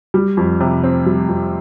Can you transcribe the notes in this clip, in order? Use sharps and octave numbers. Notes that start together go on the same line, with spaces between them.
G3
F2
C3
C4
G3
F2